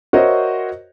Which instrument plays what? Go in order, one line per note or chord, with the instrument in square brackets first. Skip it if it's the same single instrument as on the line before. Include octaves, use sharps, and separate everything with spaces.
[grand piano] F#4 A#4 C5 C#5 D#5 E5